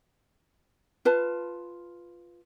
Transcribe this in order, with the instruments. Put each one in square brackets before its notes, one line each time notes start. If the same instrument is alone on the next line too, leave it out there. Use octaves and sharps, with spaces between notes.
[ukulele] F4 B4 A5